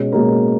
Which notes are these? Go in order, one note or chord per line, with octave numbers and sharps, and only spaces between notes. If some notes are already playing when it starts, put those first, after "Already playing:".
Already playing: B2 G#3 C#4
B2 G#3 A#3 C#4